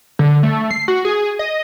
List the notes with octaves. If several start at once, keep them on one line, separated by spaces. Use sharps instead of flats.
D3
A3
C7
F#4
G#4
D#5